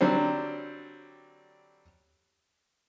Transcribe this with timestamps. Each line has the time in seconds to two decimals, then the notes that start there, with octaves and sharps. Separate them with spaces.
0.01 D3 F#3 G3 C4